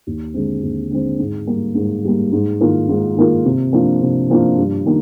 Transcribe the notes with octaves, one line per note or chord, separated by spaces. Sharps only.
D#2
D3 G#3 C4
D#2
D3 G#3 C4
G#2
G3 A#3
G#2
G3 A#3
G#2
D#3 A#3 F4 A#4
G#2
D#3 A#3 F4 A#4
C3
F3 A#3 D4 F4
C3
F3 A#3 D4 F4
G2
D#3 A#3